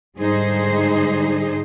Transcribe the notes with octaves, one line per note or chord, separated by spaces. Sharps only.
G#2 D3 G3 D#4 G#4 C5